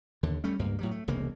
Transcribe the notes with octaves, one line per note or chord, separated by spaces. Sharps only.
D#2 D3
G3 A3 C#4
C#2 G2 A#3
A2 F#3 G3
A3
E1 C2 C#3 A#3